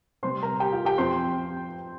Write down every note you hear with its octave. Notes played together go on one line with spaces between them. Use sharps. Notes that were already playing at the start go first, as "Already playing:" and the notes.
C3 G3 C4 C5 C6
A#4 A#5
G4 G5
F4 F5
G4 G5
F2 F3 C4 C5 C6